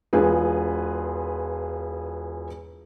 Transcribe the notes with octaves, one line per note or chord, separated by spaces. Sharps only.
E1 F4 G#4 B4